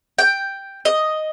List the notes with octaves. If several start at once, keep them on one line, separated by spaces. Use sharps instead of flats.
G5
D#5